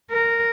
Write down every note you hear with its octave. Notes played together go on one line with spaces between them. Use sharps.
A#4